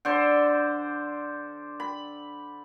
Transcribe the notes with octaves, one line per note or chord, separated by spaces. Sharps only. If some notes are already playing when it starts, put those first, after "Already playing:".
D3 C5
B5